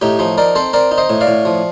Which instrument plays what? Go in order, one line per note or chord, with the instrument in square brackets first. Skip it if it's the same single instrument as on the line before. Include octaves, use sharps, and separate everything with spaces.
[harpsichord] A2 D#4 G4
F3 D#4
D#4 A#4 D5
C4 A4 C5
C4 A#4 D5
D#4
C5 D#5
A2
D5 F5
A2
F3